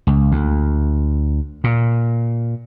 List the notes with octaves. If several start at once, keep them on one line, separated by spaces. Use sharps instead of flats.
C#2
D2
A#2